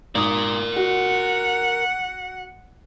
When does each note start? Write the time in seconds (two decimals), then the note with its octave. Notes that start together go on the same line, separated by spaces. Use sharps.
0.15 G#1 A#4 D5 D#6
0.76 F#4 F#5